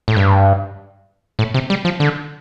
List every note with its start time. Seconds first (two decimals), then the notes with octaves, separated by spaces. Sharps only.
0.08 A2
0.17 G2
1.39 A2
1.54 C3
1.70 G3
1.85 F3
2.00 D3